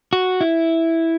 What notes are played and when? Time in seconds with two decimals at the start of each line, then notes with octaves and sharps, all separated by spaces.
0.13 F#4
0.41 E4